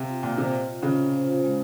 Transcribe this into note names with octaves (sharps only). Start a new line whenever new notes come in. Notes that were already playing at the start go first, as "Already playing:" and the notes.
Already playing: C3 F5
F4
A#2 A#3
C3 C5
D#5
F4
C#3 F4
F4
C5
F4
G#3